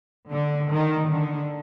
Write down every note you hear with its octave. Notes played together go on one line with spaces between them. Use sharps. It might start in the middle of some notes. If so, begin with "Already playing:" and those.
D3
D#3
D3